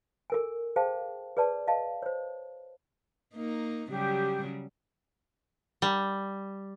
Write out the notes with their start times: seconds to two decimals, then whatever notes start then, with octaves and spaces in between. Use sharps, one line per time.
0.30 A4 A#4 G#5
0.76 G#4 C5 F5 G5 A5
1.37 G#4 B4 D5 A5
1.67 D#5 F5 A5
2.02 C5 C#5
3.35 A#3 D#4
3.89 C#3 F#3 G3 G4
5.82 G3